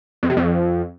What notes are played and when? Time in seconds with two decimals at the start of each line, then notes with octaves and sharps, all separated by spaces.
0.23 F2
0.30 C3
0.37 F2